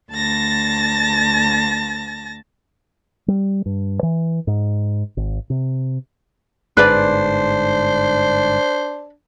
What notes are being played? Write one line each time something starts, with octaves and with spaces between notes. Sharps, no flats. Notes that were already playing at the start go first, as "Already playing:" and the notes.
D2 A5 A6 A#6
G3
G2
E3
G#2
G#1
C3
G1 G#2 D4 B4 C5 D5